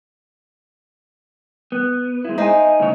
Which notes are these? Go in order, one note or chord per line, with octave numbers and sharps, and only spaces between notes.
B3
G#3 E4
D#4 C5 E5 G#5
A2 C#3 C#5